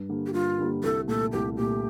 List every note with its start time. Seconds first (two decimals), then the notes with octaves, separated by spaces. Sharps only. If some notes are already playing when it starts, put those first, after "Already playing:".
Already playing: G2
0.09 D3 G3 A#3
0.26 G4
0.33 G2 F4
0.58 D3 G3 A#3
0.84 C2 A4
1.08 A#2 A3 A4
1.32 C2 G4
1.57 A#2 A3 G4